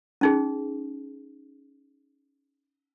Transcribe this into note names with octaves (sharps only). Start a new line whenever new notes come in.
C#4 D#4 G#4